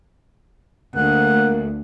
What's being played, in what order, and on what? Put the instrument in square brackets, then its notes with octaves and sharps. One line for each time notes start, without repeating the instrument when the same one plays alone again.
[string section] D2 [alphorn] A#3 [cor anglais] F#5